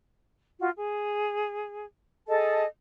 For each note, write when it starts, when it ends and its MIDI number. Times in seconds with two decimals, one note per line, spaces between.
0.60 0.69 65
0.60 0.69 66
0.75 1.86 68
2.27 2.64 68
2.27 2.64 69
2.27 2.64 75
2.27 2.64 81